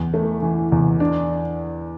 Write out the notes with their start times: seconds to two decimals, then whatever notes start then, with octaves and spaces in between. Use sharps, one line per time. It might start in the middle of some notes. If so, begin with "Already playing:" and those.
Already playing: E2
0.14 A3
0.42 E3
0.72 E2
1.00 D4